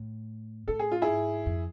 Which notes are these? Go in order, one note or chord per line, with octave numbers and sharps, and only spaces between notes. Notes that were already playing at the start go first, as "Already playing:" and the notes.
Already playing: A2
A2 A4
G#4
F4
E4 G#4
G#2
F2